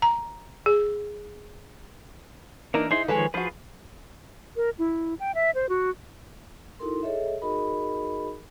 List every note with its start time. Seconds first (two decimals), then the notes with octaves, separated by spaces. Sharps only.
0.02 A#5
0.66 G#4
2.74 E3 A#3 D4 D#4 A#4
2.91 D#4 E4 G#4 C5 C6
3.08 D#3 F3 G#3 A4 B4 C#5
3.34 F3 F4 F#4 G#4 B4
4.56 A#4
4.79 E4
5.20 G5
5.35 E5
5.55 C5
5.69 F#4
6.79 D#4 E4 F#4 A4 A#4 C6
7.03 G#4 A4 C#5 D#5 E5
7.42 D#4 F#4 G#4 A#4 D#5 B5